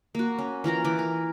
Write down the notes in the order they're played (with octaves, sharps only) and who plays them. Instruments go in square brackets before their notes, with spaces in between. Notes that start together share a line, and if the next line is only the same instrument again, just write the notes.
[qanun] A#3 F#4
C#4
E3 F4 A#4 A#5
E3 D6
A#4